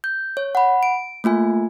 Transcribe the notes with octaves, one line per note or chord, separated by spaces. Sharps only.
G6
C#5
F#5 B5
D7
A3 A#3 F4 G#5